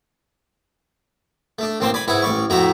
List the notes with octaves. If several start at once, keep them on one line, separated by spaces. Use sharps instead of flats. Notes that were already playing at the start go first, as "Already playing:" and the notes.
A3 D4
A1 A#3 C4 A5 C6
D5 G#5 B5
G#2 E4 B4 F#5 G#5
A1 D5 C#6
F2 A2 A3 F#4 E5 A#5